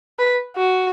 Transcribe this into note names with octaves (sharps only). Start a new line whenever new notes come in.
B4
F#4